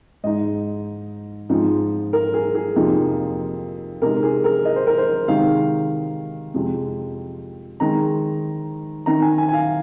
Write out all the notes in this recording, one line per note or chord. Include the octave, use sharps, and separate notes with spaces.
G#2 G#3 D#4 D#5
G#2 F3 G#3 C4 D#4
A#4
G#4
G#4
F2 C3 F3 A#3 D#4
C3 G#3 D#4 A#4
G#4
A#4
D#5
C5
A#4
C5
C3 D#3 G#3 D#4 F5
F2 C3 G#3
D#3 G#3 C4 D#4 A#5
D#3 C4 D#4 A#5
G#5
G#5
G#5
F5